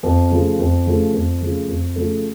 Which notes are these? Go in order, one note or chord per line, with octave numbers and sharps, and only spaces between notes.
F2
C#3 F3 A3
F2
C#3 F3 A3
F2
C#3 F3 A3
F2
C#3 F3 A3